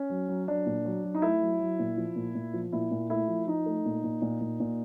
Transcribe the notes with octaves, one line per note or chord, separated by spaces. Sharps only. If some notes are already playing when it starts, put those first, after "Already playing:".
Already playing: C#4
F#3
F#3
F#3 D4
A#2
F#3
F#3
D#4
A3 E4
F#3
F#3
A#2
F3
A#2
A#2
F3
A#2 E4
A#2
A3 E4
F3
F3 D#4
A3
A#2
A#2
A#2
A#2
A#2